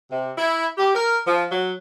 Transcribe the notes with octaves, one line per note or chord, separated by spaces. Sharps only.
C3
E4
G4
A#4
F3
F#3